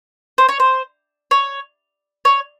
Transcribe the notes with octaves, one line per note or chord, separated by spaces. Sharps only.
C5
C#5
C5
C#5
C#5